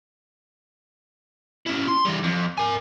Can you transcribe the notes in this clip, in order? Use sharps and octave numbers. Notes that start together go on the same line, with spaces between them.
C#4 E4
C6
E3 G3
F2
A#4 G#5